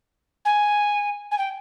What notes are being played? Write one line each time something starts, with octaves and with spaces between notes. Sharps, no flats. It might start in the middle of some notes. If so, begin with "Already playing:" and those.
G#5
G#5
G5